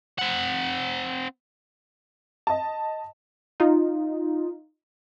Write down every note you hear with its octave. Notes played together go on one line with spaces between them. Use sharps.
C4 F#5
D#5 A5
D#4 F4